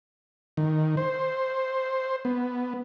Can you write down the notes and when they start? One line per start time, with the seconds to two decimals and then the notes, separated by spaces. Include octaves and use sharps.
0.57 D#3
0.97 C5
2.25 B3